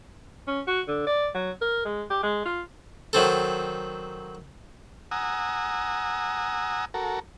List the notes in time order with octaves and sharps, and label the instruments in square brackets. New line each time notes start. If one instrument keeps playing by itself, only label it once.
[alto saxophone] C#4
F#4
D3
D5
F#3
A#4
G#3
G4
G#3
F4
[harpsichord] D#3 F#3 C4 A4
[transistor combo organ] F#5 G#5 A#5 D#6 E6
F#4 A4 A#4